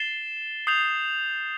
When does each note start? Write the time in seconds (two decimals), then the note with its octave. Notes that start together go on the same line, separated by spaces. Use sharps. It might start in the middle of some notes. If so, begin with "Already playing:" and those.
Already playing: A6 C7 E7 G7
0.67 D#6 G6 C7 F7